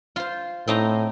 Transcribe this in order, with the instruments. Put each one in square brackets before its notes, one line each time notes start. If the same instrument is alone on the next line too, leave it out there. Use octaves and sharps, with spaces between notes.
[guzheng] F4 C5
[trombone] A2 [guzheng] C4 D#4 A#5